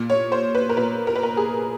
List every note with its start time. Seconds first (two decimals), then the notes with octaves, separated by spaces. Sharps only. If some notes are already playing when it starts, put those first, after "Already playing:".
Already playing: A#2
0.10 C#5
0.32 C5
0.55 B4
0.69 A#4
0.77 A#2 B4
1.07 A#4
1.15 B4
1.23 A#4
1.37 G#4